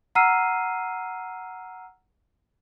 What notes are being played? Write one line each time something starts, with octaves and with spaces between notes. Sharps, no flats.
F#5 A#5 E6 F6 C7 D#7